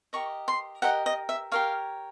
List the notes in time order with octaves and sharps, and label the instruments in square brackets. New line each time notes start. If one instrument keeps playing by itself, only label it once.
[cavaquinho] G4 A#4 D#5 C#6
C6
G4 A#4 D#5 F#5
D#5
E5
G4 A#4 C#5 F5